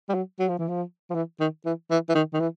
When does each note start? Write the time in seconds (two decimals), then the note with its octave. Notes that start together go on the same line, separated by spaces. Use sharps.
0.09 G3
0.14 F#3
0.39 F#3
0.49 F3
0.58 E3
0.68 F3
1.10 F3
1.15 E3
1.40 D#3
1.65 E3
1.90 E3
2.09 E3
2.15 D#3
2.33 D#3
2.40 E3